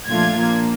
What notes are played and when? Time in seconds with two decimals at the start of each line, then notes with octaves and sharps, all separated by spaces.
0.08 A#2 F3 A3 D4 F4 G#6
0.37 A#2 F3 A#3 D4